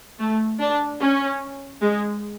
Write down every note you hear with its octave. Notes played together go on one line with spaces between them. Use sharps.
A3
D4
C#4
G#3